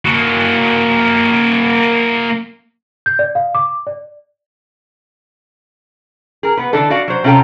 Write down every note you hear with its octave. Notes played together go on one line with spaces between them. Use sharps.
A#3 F#4
G6
D5
F5
D6
D5
G#4 A#4
B3 B4
D3 E3 D4 A4
F#4 D5 F5
F#3 C5
C3 C#4 F4 A4 G5 A#5